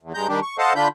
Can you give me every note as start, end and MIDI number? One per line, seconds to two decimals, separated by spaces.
0.02 0.13 40
0.14 0.27 43
0.14 0.27 56
0.14 0.27 82
0.14 0.27 91
0.29 0.40 51
0.29 0.40 55
0.29 0.40 62
0.29 0.40 67
0.42 0.57 85
0.58 0.73 69
0.58 0.73 72
0.58 0.73 75
0.58 0.73 77
0.58 0.73 78
0.58 0.73 81
0.76 0.88 50
0.76 0.88 62
0.76 0.88 65
0.76 0.88 83
0.76 0.88 91